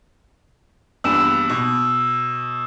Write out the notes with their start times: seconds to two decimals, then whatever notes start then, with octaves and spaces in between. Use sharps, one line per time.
1.04 A#1 E2 G2 E6 E7
1.49 B2